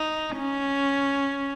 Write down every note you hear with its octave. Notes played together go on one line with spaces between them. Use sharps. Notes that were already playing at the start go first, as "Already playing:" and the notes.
Already playing: D#4
C#4